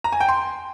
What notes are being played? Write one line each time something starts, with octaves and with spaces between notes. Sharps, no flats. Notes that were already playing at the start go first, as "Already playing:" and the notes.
A#5
G#5
G5
C6